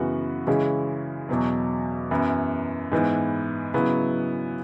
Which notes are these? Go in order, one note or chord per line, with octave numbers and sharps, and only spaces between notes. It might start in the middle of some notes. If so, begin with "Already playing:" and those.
Already playing: F#2 C#3 E3 B3 F#4
C#3 E3 G#3 C#4 E4
E2 B2 F#3
F#2 E3 B3 E4
G#2 E3 B3 E4
C#3 F#3 B3 E4